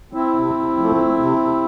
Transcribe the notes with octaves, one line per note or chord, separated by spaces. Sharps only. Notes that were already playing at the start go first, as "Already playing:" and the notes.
C4 E4
C3
F3 A3
C3